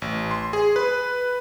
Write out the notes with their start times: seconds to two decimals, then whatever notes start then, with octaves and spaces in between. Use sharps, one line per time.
0.02 A1
0.31 C6
0.53 G#4
0.76 B4